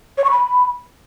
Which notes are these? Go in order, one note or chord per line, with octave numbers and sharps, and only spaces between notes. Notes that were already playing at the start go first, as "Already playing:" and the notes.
C#5
C#6
B5